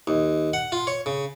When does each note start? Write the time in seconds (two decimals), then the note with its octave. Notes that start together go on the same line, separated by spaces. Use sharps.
0.07 D#2
0.53 F#5
0.72 F4
0.87 C#5
1.06 C#3